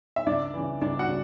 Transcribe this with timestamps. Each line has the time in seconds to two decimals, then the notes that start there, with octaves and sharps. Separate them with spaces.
0.16 E5
0.26 C#2 D4 D5
0.54 C#3 E3
0.81 C#2 D4 D5
0.99 F#4 F#5
1.08 C#3